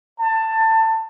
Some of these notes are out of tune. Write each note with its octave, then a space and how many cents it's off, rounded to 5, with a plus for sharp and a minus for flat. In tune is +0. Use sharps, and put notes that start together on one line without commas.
A5 +20